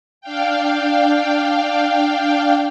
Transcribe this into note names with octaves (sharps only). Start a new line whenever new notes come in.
D4 F5 G5